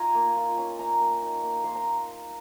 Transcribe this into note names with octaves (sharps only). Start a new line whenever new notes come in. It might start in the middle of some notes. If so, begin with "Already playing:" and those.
Already playing: D#4 F4 G#5 A#5
A#3
F4
C#4
D#4 A#5
A#3
D#4
A#3
A#3 C6
A#5